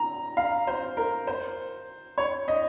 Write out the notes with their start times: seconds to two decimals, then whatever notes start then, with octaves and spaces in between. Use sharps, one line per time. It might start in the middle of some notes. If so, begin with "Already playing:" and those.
Already playing: A#5
0.37 F5
0.67 C5
0.97 A#4
1.27 C5
2.18 C#5
2.48 D#5